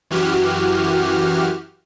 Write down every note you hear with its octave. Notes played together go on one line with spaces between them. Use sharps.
F#2 E3 F#4 G4 F6